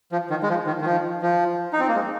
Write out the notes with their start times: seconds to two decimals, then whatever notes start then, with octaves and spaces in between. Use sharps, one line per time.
0.12 F3
0.30 D#3
0.43 G#3
0.49 F3
0.67 D#3
0.81 D#3
0.85 F3
1.22 F3
1.73 D#4
1.80 C4
1.88 A#3
1.95 G#3